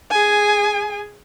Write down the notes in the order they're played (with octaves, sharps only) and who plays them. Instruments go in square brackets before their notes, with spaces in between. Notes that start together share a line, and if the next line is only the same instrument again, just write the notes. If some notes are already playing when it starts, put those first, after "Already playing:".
[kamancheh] G#4 G#5